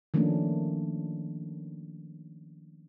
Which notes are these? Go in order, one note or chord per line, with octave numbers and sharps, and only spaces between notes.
D#3 F3 A3 A#3 C#4 D4